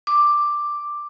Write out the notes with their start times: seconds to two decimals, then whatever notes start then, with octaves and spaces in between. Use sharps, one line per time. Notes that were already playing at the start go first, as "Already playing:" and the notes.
0.07 D6